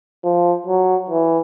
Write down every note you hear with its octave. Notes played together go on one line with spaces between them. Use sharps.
F3
F#3
E3